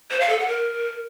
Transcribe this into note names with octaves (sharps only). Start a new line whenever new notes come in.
C5
F5
A4
F#5
A#4